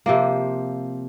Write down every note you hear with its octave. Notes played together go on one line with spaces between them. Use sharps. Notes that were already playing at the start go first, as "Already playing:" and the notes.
C3 F3 A#3